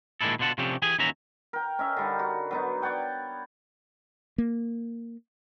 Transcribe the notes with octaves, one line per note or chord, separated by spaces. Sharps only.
A#2 D#3 G#3 D4 E4 A4
B2 D3 F4 F#5 A5
C3 F3 C#4 D4 G4 A4
E3 G4 G#4 G#5
D#2 E3 C#4 F#4 E5 A#5
A#4 G5
C#4 D#5 E5
D3 G3 D#4
F#4
F#3 B3 D#4
C#5 D5 F#5 G5
A#3